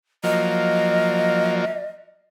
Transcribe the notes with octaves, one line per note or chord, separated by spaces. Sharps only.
F3 F#3 A#3 D#5